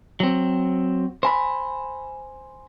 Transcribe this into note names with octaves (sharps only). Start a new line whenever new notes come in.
F#3 C4
C5 G#5 B5